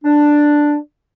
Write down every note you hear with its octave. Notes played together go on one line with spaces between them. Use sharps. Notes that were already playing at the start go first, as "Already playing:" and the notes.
D4